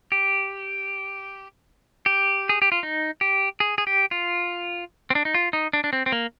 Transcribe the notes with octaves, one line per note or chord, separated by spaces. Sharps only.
G4
G4
G#4
G4
F4
D#4
G4
G#4
G#4
G4
F4
C4
D4
D#4
F4
D#4
D4
D4
C4
C4
A#3